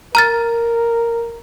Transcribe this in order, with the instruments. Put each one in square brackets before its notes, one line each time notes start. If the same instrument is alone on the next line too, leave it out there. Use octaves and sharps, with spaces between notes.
[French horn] A#4 [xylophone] A#5 F6 A6